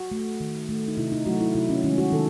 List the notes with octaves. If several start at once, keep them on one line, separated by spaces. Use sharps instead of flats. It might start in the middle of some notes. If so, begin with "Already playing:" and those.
Already playing: F#4
A3
D#3
A3
D#4
C3 E4
D#4
F#3 A3 F#4
E4
C3 E4
C#4
D#3 G#3 C#4
F#4
D#3 A4